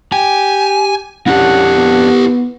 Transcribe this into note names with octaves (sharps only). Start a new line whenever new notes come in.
G4 G#5
F2 C#4 D4 E4 G4 F#5
B3